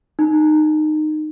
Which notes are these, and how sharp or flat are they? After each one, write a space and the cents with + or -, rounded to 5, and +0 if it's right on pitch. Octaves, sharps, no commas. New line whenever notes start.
D#4 -20